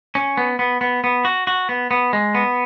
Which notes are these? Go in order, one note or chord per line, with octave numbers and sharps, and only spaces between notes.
C#4
B3
B3
B3
B3
F#4
F#4
B3
B3
G#3
B3